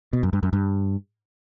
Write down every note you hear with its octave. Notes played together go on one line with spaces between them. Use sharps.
B2
F#2
G2
F#2
G2